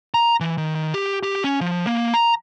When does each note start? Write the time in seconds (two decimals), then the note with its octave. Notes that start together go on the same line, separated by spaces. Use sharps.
0.14 A#5
0.40 E3
0.58 D#3
0.75 D#3
0.94 G4
1.23 G4
1.44 C#4
1.61 F3
1.87 A#3
2.14 A#5